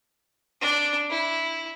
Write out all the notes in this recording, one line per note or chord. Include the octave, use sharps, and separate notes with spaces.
D4
E4